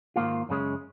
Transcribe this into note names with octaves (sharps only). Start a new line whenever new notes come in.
G#2 D#3 A#3 F4
F#2 C#3 G#3 C#4